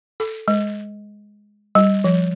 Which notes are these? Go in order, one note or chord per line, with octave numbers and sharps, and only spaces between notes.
A4
G#3
G3
F3